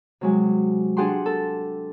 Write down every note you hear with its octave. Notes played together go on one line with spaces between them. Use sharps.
C3 F#3 G#3
D4 G4 G#4 F#5 G5 C6
A4